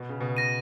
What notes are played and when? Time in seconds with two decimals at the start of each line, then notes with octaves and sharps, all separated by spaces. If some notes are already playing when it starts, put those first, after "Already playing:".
Already playing: B2
0.09 C#3
0.20 B2
0.37 A#6 D#7